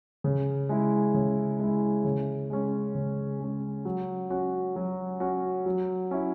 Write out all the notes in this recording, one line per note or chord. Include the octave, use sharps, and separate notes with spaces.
C#3
G#3 E4
C#3
G#3 E4
C#3
G#3 C#4
C#3
G#3 C#4
F#3
C#4 F#4
F#3
C#4 F#4
F#3
C#4 E4